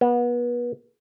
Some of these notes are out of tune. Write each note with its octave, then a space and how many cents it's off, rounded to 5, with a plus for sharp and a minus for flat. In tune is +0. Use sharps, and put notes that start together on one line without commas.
B3 -30